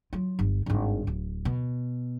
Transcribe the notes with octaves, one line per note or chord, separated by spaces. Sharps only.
F#3 F4
G1
G#1 G2
D1
B2